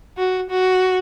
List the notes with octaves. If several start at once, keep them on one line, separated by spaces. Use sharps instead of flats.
F#4
F#4